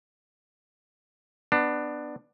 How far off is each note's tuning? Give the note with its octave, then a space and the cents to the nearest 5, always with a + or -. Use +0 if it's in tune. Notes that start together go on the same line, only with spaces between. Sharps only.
B3 +5 D4 +15